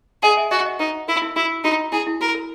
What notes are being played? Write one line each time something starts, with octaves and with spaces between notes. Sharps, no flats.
G#4 D#5 F#5
E5 G#5
F#4 D#5 F#5
D#5 F#5
D#4 B4
E4 A#4
E4
E4 F#4
D#4 F#4
E4 G#4
E4
F#4 A#4
A#4